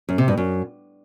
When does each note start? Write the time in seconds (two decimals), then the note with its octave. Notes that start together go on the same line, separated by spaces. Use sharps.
0.09 F#2
0.18 C3
0.28 G2
0.37 F#2